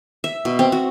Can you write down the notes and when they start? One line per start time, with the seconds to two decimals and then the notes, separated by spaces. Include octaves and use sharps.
0.24 E5
0.45 B2
0.59 C4
0.72 F#4